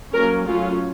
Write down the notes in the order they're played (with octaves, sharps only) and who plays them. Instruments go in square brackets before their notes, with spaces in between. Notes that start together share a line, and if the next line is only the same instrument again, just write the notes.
[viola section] F#3 A#3 C#4 A#4
F#3 A3 C#4 F4